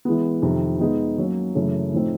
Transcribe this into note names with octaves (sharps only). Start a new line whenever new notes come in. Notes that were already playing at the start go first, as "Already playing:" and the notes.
E3 G#3 B3
F2 C3 D#3
G#3 B3 D#4
F#3 A#3 C#4
F#2 C#3 E3 A3 C#4
A2 F3 A3 C4 D#4